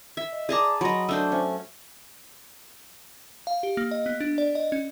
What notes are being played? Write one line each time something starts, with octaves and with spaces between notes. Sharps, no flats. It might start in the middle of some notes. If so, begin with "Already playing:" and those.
E5
D#5
G#4 D5 A5 A#5 D6
F#3 D#5 B5 C6 A#6
A3 D4 C5 E6
C#4 C5 E5 G#5
F5
G4
A#3
D#5
B3
D4
D5
D#5
C#4